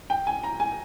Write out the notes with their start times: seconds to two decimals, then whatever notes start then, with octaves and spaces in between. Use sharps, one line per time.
0.10 G5
0.27 G#5
0.43 A#5
0.60 G#5